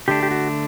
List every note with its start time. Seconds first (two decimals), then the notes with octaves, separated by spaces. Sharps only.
0.08 D3 A3 D4 G4
0.23 G4
0.31 F#4